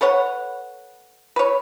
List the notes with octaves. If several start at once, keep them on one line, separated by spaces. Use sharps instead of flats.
A4 B4 C#5 F#5
B4 C#5